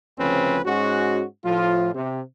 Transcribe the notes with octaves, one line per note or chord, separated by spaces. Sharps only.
D2 C#3 F3 C4 C#4 B4
G#2 G#3 C#4 F#4
A2 F3 F4
C3